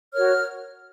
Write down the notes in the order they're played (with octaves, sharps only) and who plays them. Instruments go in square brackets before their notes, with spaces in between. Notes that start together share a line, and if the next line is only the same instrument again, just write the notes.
[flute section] F#4 A#4 C#5 F6